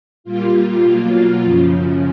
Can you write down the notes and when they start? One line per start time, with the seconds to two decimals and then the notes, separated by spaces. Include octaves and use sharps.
0.24 A#2 G3 A#3 F4
0.82 B2 F#3 A#3
1.40 F#2 C#3 F3